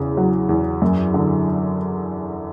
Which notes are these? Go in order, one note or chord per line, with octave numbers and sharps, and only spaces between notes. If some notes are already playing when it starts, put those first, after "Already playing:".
Already playing: E2 C#3
F#3
E2
F#2
D3